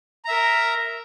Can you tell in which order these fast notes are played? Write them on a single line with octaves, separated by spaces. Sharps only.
A#5 E5 A#4